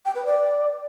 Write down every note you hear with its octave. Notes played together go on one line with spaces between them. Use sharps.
G5
B4
D5